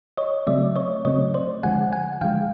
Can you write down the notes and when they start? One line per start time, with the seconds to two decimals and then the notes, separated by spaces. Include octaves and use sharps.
0.17 C#5 D#5
0.47 C#3 F#3 A3 C4 D5 E5
0.76 C#5 D#5
1.05 C#3 F#3 A3 C4 C#5 D#5
1.34 C5 D5
1.63 D3 F3 G#3 F#5 G#5
1.93 F#5 G#5
2.21 D3 F3 G#3 F5 G5